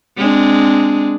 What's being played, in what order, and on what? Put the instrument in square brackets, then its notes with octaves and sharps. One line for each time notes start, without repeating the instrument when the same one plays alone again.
[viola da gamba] G#3 C4 D4